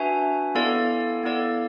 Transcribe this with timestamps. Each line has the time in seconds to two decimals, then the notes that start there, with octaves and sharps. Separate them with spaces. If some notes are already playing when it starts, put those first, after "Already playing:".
Already playing: D4 F#4 B4 E5 G#5
0.55 B3 E4 A4 D5 F5
1.23 B3 E4 A4 D5 F5